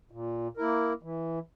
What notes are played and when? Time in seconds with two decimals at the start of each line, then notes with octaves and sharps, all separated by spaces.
0.11 A#2
0.57 A#3 E4 A#4
1.03 E3